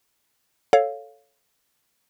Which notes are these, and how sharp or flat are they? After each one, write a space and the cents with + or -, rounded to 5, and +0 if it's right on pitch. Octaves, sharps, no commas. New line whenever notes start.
A4 +0 C#5 +0 F5 +0